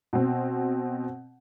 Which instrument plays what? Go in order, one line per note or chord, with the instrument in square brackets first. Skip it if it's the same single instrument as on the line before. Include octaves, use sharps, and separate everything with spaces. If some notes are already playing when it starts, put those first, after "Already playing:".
[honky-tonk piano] B2 C4